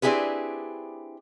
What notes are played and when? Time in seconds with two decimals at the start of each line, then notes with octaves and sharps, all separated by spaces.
0.02 C4 D4 E4 G4 G#4 B4